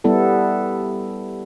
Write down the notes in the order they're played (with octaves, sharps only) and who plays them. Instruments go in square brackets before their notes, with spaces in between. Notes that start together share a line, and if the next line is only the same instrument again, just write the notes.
[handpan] G3 B3 E4 A4